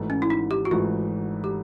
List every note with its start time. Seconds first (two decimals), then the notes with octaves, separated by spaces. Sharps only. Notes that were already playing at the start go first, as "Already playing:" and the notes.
Already playing: G#1 G#2 E3 A3
0.10 C#4
0.22 E4
0.30 D#4
0.51 G4
0.65 F#4
0.71 G#1 G#2 E3 A3 F4
1.44 G4